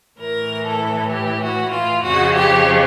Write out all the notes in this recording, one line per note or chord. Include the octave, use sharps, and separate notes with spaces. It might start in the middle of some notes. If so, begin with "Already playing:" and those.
A2 E3 A#4
A4
G4
F#4
F4
F2 C#3 F3 F#4
G4